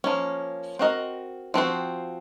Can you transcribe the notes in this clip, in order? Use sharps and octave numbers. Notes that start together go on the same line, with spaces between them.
F3 A#3 C#4
C4 F#4 A#4 D#5
F3 C4 F#4 C5